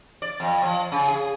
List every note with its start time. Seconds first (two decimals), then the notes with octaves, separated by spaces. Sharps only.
0.22 D5
0.40 F2
0.63 F3
0.92 C#3
1.08 G#4